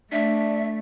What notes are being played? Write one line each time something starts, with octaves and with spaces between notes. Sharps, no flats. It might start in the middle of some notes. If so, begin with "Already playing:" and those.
A3 D4 E5